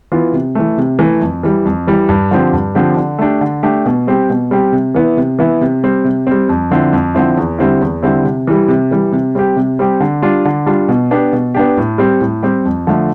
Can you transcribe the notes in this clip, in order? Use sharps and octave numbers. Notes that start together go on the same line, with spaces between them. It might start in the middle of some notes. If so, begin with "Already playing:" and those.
E3 B3 F4
C3
E3 A3
C3
E3 A3
F2
E3 G3
F2
E3 G3
G2
D3 F3 C4 G4
G2
D3 F3 C4 G4
D3
A3 D4 G4
D3
A3 D4 G4
B2
G3 C4 G4
B2
G3 C4 G4
C3
E3 B3 E4
C3
E3 B3 E4
C3
G3 C4
C3
G3 C4
F2
D3 F3 C4 E4
F2
D3 F3 C4 E4
E2
D3 G3 C4 E4
E2
D3 G3 C4 E4
C3
E3 G3
C3
E3 G3
C3
G3 C4 G4
C3
G3 C4 G4
D3
G3 D4 F4
D3
G3 D4 F4
B2
B3 D4 G4
B2
B3 D4 G4
A2
G3 C4 G4
A2
G3 C4 G4
F2
D3 F3 A3